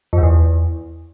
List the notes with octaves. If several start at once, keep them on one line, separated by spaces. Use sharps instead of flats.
F2
G#2
E2